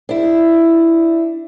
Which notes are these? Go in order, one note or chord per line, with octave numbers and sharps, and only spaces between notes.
D4 E4